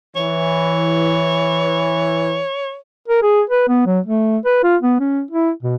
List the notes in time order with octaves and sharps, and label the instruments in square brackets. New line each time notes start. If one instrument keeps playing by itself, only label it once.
[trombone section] E3 [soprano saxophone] C#5
[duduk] A#4
G#4
B4
B3
F#3
A3
B4
F4
B3
C#4
E4
B2